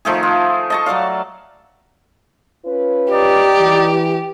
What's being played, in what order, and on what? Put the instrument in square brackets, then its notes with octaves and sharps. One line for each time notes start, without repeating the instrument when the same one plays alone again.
[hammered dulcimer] D#3 F3 A3 G#4
F4
D#5 A5 C#6
F#3 A4 D5 F5
[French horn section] C#4 F4 B4
[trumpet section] D#4 D5 [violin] G4
[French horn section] E3